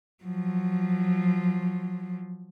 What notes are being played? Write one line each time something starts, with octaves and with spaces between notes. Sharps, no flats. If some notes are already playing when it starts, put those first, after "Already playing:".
F3 F#3